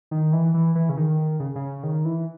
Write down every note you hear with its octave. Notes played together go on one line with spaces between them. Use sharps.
D#3
E3
E3
E3
C#3
D#3
C#3
C#3
D#3
E3